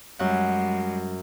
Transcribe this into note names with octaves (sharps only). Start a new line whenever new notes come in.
F#2 G3 G#3 F#5